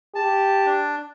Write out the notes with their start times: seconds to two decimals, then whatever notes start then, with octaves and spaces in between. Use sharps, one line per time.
0.15 G4 A5
0.66 D4